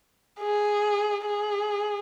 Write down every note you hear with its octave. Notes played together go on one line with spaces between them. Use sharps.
G#4
G#4